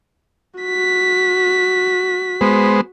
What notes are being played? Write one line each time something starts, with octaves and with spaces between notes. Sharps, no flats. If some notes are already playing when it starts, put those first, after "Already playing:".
F#4 B6
G#3 B3 C5